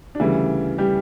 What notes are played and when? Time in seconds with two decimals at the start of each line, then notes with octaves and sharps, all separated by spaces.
0.15 D4
0.20 D2 C#3 E3 G3 E4
0.78 G3 G4